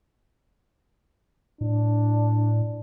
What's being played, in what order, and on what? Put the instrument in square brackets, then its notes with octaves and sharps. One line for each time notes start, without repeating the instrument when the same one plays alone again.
[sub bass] A2 [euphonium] D4